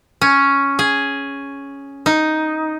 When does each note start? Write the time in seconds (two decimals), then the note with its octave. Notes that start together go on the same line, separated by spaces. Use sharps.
0.21 C#4
0.79 G#4
2.06 D#4